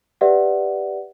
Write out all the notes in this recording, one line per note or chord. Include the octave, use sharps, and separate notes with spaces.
G4 B4 D5 E5 F#5